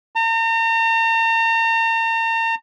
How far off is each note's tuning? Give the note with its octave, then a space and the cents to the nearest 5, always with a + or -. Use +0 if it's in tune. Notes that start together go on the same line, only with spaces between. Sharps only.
A#5 -40